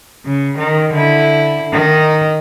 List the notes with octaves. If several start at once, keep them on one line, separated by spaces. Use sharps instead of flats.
C#3
D#3
D3 E4
D#3 D#4